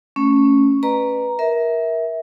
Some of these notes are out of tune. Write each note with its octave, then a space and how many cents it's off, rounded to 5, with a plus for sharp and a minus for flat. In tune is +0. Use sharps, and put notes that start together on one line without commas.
A3 +15 C#4 +0
B4 +0 D5 +45 A#5 +0
A#4 +20 E5 -20